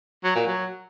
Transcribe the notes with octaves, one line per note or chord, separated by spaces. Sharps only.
F#3
A#2
F#3